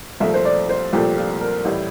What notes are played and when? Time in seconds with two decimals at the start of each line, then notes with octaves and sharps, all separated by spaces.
0.20 C2 A#2 F3 A3 E5
0.34 C5
0.45 D5
0.69 C5
0.93 C2 A#2 F3 A3 G4
1.17 F4
1.41 A#4
1.65 A1 A2 G3 E4